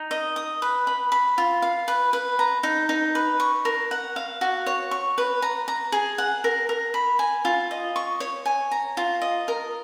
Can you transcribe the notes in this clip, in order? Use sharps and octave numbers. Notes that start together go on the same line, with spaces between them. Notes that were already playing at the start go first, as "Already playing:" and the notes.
Already playing: D#4
D#5
D#6
B4
B5
B5
F4
F5
B4
B4
A#5
D#4
D#4
B4
C#6
A#4
F#5
F5
F#4
C#5
C#6
B4
A#5
A#5
G#4
F#5
A#4
A#4
B5
G#5
F4
D#5
C#6
C#5
G#5
A#5
F4
D#5
A#4